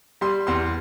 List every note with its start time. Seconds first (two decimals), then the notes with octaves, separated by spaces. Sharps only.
0.21 G3 C6
0.47 E2 C6